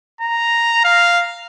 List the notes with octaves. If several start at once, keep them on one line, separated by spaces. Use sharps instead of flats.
A#5
F5